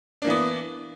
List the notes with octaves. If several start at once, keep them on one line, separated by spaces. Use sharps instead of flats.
E3 A#3 B3 D4